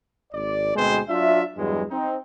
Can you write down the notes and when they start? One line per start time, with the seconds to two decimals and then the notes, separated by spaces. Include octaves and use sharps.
0.33 G#1 D5
0.76 D2 B2 G#3 B3 C4 C5
1.08 F#3 D4 F4 E5
1.56 E2 G2 F#3 G#3
1.91 C4 D#4